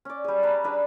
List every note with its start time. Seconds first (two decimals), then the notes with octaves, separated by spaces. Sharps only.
0.05 C#4 D5
0.24 G3 G#4
0.43 B4 A5 A#5
0.64 D4 G#4 B4